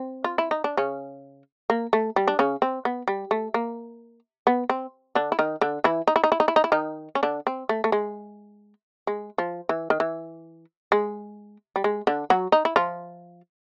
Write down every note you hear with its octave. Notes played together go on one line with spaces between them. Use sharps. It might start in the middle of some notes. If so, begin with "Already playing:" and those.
Already playing: C4
F4
E4
D#4
D4
C#3 C#4
A#3
A3
G3
D4
C#3 C#4
C4
B3
G3
A3
A#3
B3
C4
D3 D4
E4
D#3 D#4
D3 D4
E3 E4
D#4
E4
D#4
E4
D#4
E4
D#4
E4
D#3 D#4
C#4
D3 D4
C4
A3
A3
G#3
G#3
F3
E3
D#3
E3
G#3
G3
G#3
D3 D4
F#3 F#4
D#4
E4
F3 F4